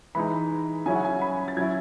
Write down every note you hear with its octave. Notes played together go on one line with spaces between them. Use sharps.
E3 G#3 D#4 B5
C#3 F#3 C#4 E4 G#5
F#5
G#5
B5
A6
F#3 C#4 E4 G#6